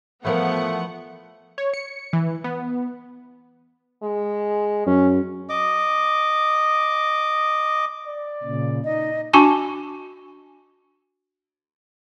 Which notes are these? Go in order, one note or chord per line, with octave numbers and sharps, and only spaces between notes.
E3 F3 A3 B3 A#4 F#5
C#5
C#7
E3
B3
G#3
F#2 C#4
D#5 D6
D5
A#2 C#3
D#4 D#5
D4 F#4 G#5 A5 C#6 D6